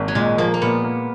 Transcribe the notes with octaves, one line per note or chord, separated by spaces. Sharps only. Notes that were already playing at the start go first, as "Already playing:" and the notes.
Already playing: G#1 A#3
F#3
A#2 G#3
F3 A#3
A#3
A#2 B3
A#3